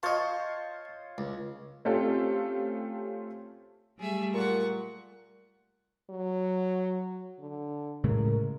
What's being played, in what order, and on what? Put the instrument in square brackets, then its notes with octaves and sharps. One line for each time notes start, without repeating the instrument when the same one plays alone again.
[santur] F4 C5 C#5 [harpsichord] D#5 A5
[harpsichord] C#2
[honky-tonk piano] A3 C4 C#4 F4 G4 A4
[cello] G3 A3 [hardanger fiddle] G#4 E5
[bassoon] A#2 [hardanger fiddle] F#5 C#6
[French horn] F#3
D3
[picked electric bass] A2 C#3 G#3 [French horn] A#4